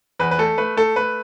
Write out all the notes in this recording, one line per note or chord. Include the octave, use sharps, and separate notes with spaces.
E2 B4
B4
A3 A4
A3 B4
A3 A4
A3 B4